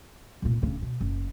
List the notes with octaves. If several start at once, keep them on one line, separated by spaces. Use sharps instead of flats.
F1 A#2
D1 C#3
B2
F#1